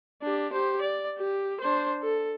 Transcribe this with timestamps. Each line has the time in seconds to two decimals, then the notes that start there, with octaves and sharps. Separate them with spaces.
0.22 D4 G4
0.52 G4 C5
0.81 D5
1.18 G4
1.60 D4 C5
2.02 A4